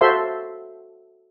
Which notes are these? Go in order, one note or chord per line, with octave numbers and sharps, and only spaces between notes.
F#4 A4 C5 E5 F5 C6